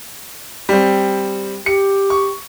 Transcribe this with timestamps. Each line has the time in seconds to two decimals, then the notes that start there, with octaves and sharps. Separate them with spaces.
0.69 G3 C4
1.66 G4 C#7
2.10 C#6